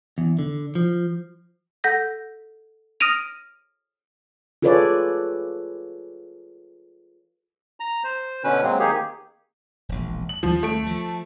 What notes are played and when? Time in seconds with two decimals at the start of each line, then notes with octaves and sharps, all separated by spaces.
0.18 E2
0.39 D3
0.75 F3
1.84 A4 F#5 G6 A#6 B6
3.00 D#6 F6 A#6 D7 D#7 F7
4.62 F4 G#4 A4 B4 C#5 D5
7.80 A#5
8.04 C5
8.44 B2 D3 C#4 B4
8.63 F#3 G#3 A#3 C4
8.80 D#3 A#3 D#4 G4 G#4
9.89 E1 A#1
10.29 F#7
10.43 D#2 D#3 F3 G3
10.63 A3 D7
10.86 F3